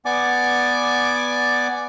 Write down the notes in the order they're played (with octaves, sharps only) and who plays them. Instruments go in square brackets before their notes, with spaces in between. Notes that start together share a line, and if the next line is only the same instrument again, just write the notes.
[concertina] B3 D5 G#5 D6